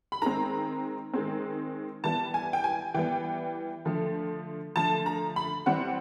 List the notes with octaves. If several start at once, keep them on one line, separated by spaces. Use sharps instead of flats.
B5
D#3 G#3 C4 A#5
D#3 G#3 C4
E3 G3 B3 A5
G#5
G5
G#5
E3 G3 B3 G5
D3 F3 A3
D3 F3 A3 A5
A#5
B5
E3 G3 C4 F#5